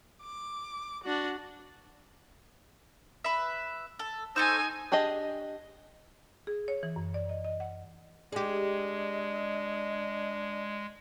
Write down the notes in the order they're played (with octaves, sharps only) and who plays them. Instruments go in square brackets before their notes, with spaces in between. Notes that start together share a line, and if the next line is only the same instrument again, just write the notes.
[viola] D6
D4 F#4
[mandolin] B4 E5
A4
[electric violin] D#4 G#5 [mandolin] A4 C#6 E6 [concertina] C5
[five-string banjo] D4 G4 G#4 D#5
[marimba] G#4
C#5
E3
F#2
D5
D#5
D#5
F#5
[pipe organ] G#3 [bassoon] D4 [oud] G4 G#4 [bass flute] D#5